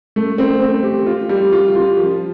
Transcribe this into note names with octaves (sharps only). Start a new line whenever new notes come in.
A3
C4
C4
G4
F4
G3
F4
F4
F3